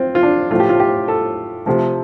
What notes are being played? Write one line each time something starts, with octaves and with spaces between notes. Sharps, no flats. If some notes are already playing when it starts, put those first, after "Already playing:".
Already playing: C4 F4
F4
D4
A2 F3 A3 F4
G4
F4
G4
A4
C3 F3 A3